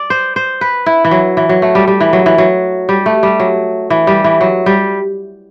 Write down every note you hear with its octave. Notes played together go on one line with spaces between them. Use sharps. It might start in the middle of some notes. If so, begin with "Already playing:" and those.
Already playing: D5
C5
C5
B4
E4
E3
F#3
E3
F#3
A3
G3
G3
E3
F#3
E3
F#3
G3
A3
G3
F#3
E3
G3
E3
F#3
G3